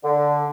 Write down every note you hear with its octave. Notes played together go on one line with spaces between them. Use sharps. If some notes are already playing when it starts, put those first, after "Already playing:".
D3